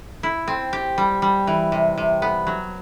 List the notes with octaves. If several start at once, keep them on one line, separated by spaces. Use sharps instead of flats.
E4
C4
G4
G3
G3
E3
C3
C3
B3
F#3